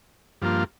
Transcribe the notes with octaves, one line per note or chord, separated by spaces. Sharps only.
G2 F3 A#3 F4